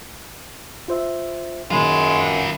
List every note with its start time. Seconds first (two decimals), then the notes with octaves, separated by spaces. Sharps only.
0.88 F4 C5 E5
1.71 F#2 A#2 D#3 F#3 G#3 F4 B4